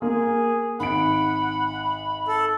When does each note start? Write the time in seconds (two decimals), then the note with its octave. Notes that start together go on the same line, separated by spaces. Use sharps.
0.02 A#3 G#4
0.80 G#1 F#5 B5 D7
2.28 A4